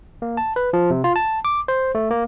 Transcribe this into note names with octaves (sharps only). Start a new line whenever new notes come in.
A#3
A5
B4
F3
C3
F4
A5
D6
C5
A3
A#3